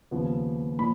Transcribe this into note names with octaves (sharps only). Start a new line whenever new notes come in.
D#2 C#3 F3 B3
A#2 F3 B5